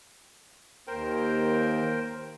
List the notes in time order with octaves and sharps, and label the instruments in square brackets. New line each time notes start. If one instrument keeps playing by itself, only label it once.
[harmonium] D#2 [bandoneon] A#4 C5 G5